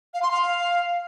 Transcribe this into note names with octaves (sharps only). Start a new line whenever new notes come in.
F5
C6
F5